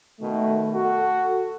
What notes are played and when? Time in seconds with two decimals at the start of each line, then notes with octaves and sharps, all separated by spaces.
0.20 B2 D#3 A3
0.73 F#4 A4